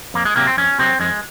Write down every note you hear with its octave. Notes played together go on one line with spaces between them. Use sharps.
F2 A#3
G#3
C3 D#3 F#3 A#3
C4
F2 C#4
C3 D#3 F#3 C4
F2 G#3